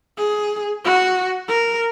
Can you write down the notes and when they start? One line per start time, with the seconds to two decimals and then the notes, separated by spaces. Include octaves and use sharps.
0.17 G#4
0.85 F#4
1.49 A#4